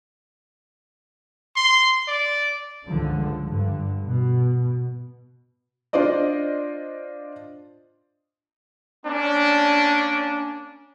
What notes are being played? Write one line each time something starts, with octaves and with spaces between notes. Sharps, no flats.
C6
D5
C#2 G2 D3 F3
G2 D3
B2
D4 F4 C5 D5 D#5
A#3 C#4 D4